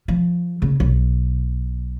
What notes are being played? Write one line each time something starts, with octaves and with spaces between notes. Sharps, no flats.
F3
C#3 A#3
B1